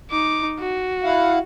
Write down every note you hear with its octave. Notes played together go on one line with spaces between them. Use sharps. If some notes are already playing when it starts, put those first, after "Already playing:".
D#4 D6
F#4
E4 F5 F#5